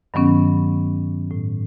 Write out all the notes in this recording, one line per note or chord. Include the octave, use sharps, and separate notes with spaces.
G2 D#3 F#3 B3 C#4
A2